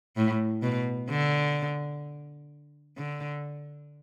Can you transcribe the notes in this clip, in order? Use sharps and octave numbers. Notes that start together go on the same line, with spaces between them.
A2
B2
D3
D3